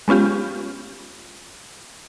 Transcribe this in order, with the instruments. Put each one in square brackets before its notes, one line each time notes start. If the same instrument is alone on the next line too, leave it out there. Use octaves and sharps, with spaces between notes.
[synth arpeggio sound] G#3 B3 C#4 F4 G4